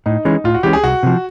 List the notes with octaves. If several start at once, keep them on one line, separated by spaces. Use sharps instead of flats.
A2 D#4
E3 G#3 C#4
A2 F4
F#4
E3 G#3 C#4 G4
G#4
C2 F#4
C3 F3